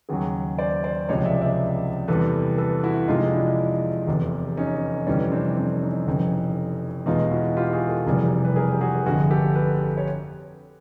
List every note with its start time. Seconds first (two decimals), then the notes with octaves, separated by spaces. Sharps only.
0.09 D#2 C#3 F#3 F#4 G#4
0.59 C5 D5
0.84 C5 D5
1.09 C#2 C3 F3 G#3 C#5 D#5
1.25 D5 E5
1.41 D5 E5
2.08 E2 C3 E3 G3 A4 B4
2.58 A4 B4
2.84 E4 F#4
3.08 F2 C3 F3 G#3 D#4 F4
3.33 D4 E4
4.07 F1 E2 C3
4.57 C#4 D#4
5.07 F1 F2 C3 E3 G3 C#4 D#4
5.32 C4 D4
5.57 C4 D4
5.82 C#4 D#4
6.07 F1 F2 C#3 E3
7.06 E2 B2 G#3 D#4 F4
7.31 E4 F#4
7.57 F4 G4
7.73 F#4 G#4
7.89 G4 A4
8.07 F1 F2 C3 E3 G3 G#4 A#4
8.45 B4
8.56 G#4 A#4
8.72 G4
8.81 F#4 G#4
9.06 G1 F2 D3 F#4 G#4
9.31 G4 A4
9.56 A4 B4
9.97 C#5